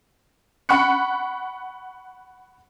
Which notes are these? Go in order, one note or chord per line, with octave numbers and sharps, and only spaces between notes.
F#5 B5 C#6 F#6 C#7